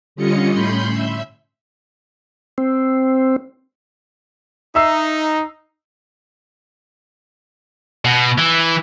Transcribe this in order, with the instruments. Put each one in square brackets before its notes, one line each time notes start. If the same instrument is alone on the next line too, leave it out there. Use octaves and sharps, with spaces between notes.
[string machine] D3 G3 C#4 F4 D#5 C#7
A2 C#4 B5 C6 G6
E5
[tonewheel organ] C4
[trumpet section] D#4 [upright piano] E5 E6 C7
[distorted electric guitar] B2
E3